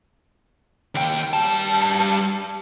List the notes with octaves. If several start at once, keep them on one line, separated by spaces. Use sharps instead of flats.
D#2 G5
G3 A5